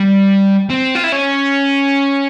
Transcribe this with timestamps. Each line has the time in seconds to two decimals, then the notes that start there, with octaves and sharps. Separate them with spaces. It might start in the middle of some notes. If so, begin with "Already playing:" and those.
Already playing: G3
0.70 C4
0.95 F4
1.04 E4
1.12 C#4